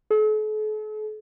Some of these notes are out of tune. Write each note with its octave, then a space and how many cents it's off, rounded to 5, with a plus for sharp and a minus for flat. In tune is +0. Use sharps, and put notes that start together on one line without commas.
A4 -45